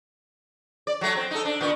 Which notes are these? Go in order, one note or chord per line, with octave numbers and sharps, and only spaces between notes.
D5
F#3 A3
C4
D#4 A4
D4
A#2 D#3 B3